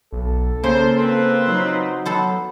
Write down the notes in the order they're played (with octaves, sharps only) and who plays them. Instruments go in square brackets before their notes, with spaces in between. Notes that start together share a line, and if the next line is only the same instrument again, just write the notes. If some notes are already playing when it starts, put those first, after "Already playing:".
[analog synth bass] B1 [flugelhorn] A4
[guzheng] C#3 [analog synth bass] A#3 [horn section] C5
[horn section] C4 F4 B4
[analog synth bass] F#3 [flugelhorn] D#4
[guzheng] B3 A4 C5